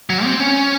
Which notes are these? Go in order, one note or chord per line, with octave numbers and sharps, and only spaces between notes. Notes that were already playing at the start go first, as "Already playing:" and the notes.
F#3
C4
C#4